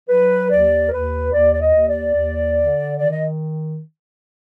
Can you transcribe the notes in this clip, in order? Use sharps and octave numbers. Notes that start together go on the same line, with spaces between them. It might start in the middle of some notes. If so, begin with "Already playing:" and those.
F#3 B4
D#2 D5
A#4
D#2 B4
D#2 D5
D5
D#5
D#2
D5
D#2
D3
D#3 D5
D#5